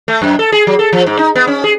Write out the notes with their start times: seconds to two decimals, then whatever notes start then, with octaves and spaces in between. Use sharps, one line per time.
0.08 A3
0.22 F#2
0.39 A4
0.52 G#4
0.67 F#3
0.79 A4
0.93 F3
1.06 G#2
1.19 D#4
1.35 B3
1.47 C#4
1.64 G#4